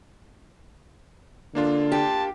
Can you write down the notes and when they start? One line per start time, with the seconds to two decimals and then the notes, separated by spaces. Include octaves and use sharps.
1.55 D3 A#3 D4 F4
1.92 G4 A5